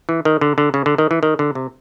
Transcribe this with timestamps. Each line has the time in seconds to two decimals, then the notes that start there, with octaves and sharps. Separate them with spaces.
0.09 E3
0.25 D#3
0.41 D3
0.58 D3
0.74 C#3
0.86 D3
0.98 D#3
1.11 E3
1.23 D#3
1.39 D3
1.55 C3